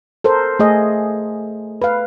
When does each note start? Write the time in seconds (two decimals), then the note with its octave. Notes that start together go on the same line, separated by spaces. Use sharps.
0.24 A4 A#4 C5
0.59 A3 G#4 D#5
1.82 B4 F5